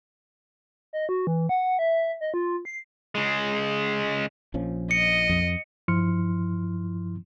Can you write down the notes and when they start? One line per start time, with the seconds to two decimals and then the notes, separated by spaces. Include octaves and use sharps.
0.93 D#5
1.09 F#4
1.27 E3
1.49 F#5
1.79 E5
2.21 D#5
2.34 F4
2.65 C7
3.15 C#3 G#3
4.54 A#1 F3 C#4
4.91 D#5 C#7
5.30 F2
5.88 G2 F3 E4 C6 F6 C#7